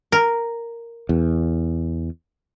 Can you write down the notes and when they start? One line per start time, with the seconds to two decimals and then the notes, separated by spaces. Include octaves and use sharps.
0.12 A#4
1.09 E2